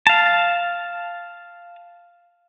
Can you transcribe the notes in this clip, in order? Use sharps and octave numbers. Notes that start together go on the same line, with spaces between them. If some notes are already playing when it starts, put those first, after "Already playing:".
F5 A5